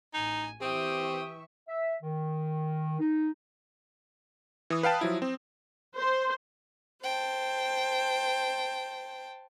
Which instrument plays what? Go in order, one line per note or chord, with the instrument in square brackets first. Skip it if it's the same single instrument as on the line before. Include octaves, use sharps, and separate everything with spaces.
[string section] A1 [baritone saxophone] D#4 [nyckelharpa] G#5
[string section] E3 E5 C#6 [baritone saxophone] C4 [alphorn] G4 [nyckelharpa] G5 D#6
[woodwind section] E5
D#3
D#4
[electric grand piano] E3 D#6
B4 F5 G5 A5
F3 F#3 E4
C4
[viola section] C5
[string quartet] C5 G5 A5